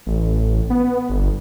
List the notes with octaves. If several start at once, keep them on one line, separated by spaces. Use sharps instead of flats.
A1
B3
G1